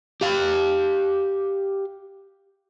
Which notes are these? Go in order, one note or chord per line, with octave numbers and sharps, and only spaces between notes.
G4 F5